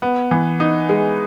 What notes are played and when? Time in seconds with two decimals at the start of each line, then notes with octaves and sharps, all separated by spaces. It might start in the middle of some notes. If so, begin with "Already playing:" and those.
0.02 B3
0.31 E3
0.60 D#4
0.89 G#3